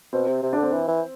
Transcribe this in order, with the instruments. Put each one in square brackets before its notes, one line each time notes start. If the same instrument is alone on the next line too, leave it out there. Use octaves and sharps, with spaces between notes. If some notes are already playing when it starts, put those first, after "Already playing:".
[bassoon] B2 [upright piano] C4
[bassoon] C3
C3
[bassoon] D3 [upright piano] D4
[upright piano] C4
[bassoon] E3
E3